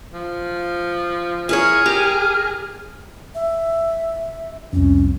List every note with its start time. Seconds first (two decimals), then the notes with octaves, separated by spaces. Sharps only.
0.14 F3
1.49 E4 G#4 A#4 C#5 F6
1.86 G4 A#4
3.35 E5
4.73 C2 F2 C#4